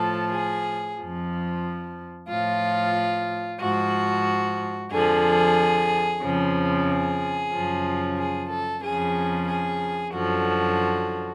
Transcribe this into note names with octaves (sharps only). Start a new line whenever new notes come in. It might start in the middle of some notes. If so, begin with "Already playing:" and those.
Already playing: A2 F3 A4
G#4
F2 F3
A2 F3 F4
G#2 F3 F#4
F2 D3 F3 G#4
F2 C#3 F3
G#4
F#2 C#3 F3
G#4
A4
F2 C#3 F3 G#4
G#4
F#2 D3 F3 F#4